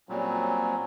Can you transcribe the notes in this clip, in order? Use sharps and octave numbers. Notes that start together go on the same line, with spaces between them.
A#2 F#3 G3 C4 C#4